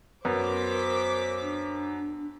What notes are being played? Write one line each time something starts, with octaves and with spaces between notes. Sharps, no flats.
F#2 B3 A#4 C5 D6 B6
A#4
D4